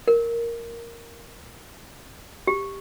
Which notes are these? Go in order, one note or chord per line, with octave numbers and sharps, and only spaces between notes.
A#4
G4